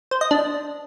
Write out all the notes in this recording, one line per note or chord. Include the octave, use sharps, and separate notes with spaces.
C5
D#5
D4